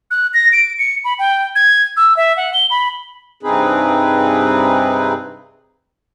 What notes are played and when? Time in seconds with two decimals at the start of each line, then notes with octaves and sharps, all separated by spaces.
0.11 F#6
0.34 A#6
0.52 D7
0.79 C#7
1.05 B5
1.19 G5
1.55 G#6
1.97 E6
2.17 E5
2.37 F#5
2.54 G7
2.70 B5
3.43 G2 C3 C4 D#4 G#4 B4